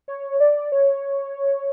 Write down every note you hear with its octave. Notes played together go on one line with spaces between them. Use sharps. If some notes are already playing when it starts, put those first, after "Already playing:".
C#5
D5
C#5